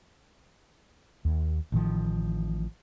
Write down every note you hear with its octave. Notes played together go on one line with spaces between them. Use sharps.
D#2
A1 A2 D#3 F3